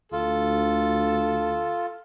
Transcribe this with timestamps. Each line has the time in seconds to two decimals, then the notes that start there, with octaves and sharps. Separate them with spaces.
0.12 D2 F4 A4